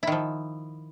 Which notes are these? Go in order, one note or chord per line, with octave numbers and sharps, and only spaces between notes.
D#3 F3 E4